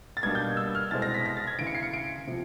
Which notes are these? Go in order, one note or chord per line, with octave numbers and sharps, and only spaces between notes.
A6
B2 G3 A#3 D4 G#6
G6
E6
F6
C2 B2 G#3 C4 A6
A#6
B6
A#6
A6
G#6
D2 C#3 E3 D7
C#7
C7
C#7
D7
C3 F3